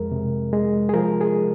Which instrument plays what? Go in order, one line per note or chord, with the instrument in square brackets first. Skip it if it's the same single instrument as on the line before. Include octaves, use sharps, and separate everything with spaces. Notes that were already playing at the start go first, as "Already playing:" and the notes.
Already playing: [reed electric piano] F2 G#3 A#4
C3
G#3
G#4
F3 A#4
G#4